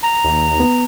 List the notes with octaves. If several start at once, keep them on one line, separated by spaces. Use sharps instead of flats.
A#5
D#2
B3